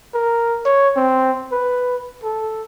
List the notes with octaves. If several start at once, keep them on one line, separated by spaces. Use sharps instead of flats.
A#4
C#5
C4
B4
A4